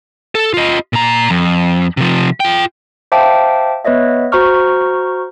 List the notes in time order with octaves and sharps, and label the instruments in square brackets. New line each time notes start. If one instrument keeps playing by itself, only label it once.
[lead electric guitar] A4
F4 D#5
A#2 A#5
F2
C3 F3
F4 G5
[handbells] C5 E5 F5 G5 A5 D6
B3 B4 C#5 D#5 E5
F#4 C5 A#5 C#6 F6